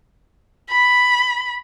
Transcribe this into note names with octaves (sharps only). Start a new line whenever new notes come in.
B5